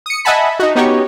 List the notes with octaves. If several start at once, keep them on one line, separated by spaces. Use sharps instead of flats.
D#6 C#7
D#5 E5 F#5 G#5 A5 B5
D#4 F#4
B3 C#4 D#4 F#4 G4 C#5